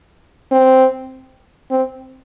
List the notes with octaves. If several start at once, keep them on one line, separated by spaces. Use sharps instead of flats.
C4
C4